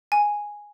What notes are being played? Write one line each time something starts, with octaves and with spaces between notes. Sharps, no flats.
G#5